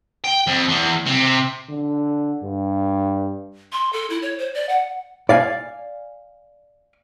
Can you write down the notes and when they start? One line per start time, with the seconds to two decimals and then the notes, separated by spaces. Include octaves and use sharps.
0.24 G5
0.47 F2
0.68 E2
1.06 C3
1.69 D3
2.43 G2
3.73 C6
3.93 A4
4.10 E4
4.22 C#5
4.38 C5
4.54 D5
4.69 F#5
5.29 D5 F5 G#5